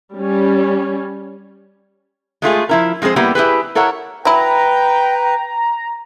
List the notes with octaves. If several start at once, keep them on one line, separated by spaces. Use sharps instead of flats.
G3 C#4
G#3 A3 F4 G#4
F3 E4 A#4
F3 G#3 C4 G#4 C5
G3 A#3 B3 E4 G4
E4 G4 G#4 B4
E4 A4 A#4 C#5 F#5
F#3 E4 B4 G5 A#5